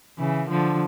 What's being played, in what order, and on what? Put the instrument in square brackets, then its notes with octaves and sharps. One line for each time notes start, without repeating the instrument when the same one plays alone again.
[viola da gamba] C#3 E3
D3 F3